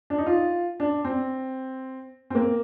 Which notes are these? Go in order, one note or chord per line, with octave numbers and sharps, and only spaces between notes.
D4
D#4
F4
D4
C4
C4
A#3